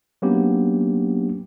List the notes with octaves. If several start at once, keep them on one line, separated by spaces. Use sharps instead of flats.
F#3 A#3 B3 C#4 D4 G4